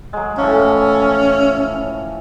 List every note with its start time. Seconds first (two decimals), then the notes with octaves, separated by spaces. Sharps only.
0.13 F#3 G#3
0.38 A2 E3 F3 C#4